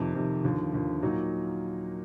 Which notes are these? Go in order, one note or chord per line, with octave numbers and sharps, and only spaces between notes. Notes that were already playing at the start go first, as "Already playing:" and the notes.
Already playing: F2 C3 D#3
F2 C3 D#3
D#2 D3 F3
D#2 D3 F3
A#2 F#3 A#3 D#4